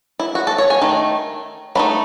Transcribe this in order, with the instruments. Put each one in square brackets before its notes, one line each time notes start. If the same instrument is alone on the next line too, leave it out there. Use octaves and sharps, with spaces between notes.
[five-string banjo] E4
F#4
A4
C#5
G#5
D#3 A3
F#3 A3 D#4 B5